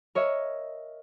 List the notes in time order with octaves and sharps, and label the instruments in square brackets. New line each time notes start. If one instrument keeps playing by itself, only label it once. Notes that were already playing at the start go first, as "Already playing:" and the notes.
[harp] A#4 C#5 D#5 E5